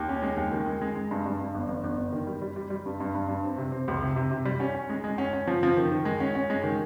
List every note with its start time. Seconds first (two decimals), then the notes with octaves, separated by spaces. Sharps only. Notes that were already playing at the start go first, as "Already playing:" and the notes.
Already playing: D#2
0.09 C#4
0.22 G#3
0.37 D#2
0.52 D#3
0.66 G#3
0.82 G#3
0.95 G#3
1.11 G2
1.26 G2
1.40 G2
1.54 G1
1.68 G1
1.84 G1
1.97 G1
2.13 D#3
2.27 G3
2.42 G3
2.56 G3
2.70 G3
2.86 G2
3.00 G2
3.15 G2
3.28 G2
3.43 C4
3.58 C3
3.72 C4
3.88 C#2
4.02 C3
4.16 C3
4.31 C3
4.45 G3
4.60 C#4
4.74 C#4
4.89 G#3
5.04 G#3
5.18 C#4
5.33 C#4
5.47 F3
5.63 F3
5.77 D#3
5.91 D#3
6.05 G#3
6.20 C#4
6.35 C#4
6.50 G#3
6.64 D#3